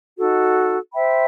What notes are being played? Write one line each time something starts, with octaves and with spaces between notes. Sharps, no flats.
D#4 F#4 A4
C5 E5 G5 B5